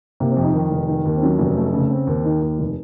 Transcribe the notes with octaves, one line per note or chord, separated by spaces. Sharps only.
C3 A#3
C4
F2
D#4
D#3
F1
D#3
D#2
C4
F#3 C#4
F1
A3
C#3
C4
D#2
D#3 D#4
D#2
F1